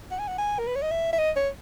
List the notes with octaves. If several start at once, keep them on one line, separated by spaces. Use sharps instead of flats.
F#5
G#5
F#5
G#5
A#4
B4
C#5
D#5
E5
E5
D#5
C#5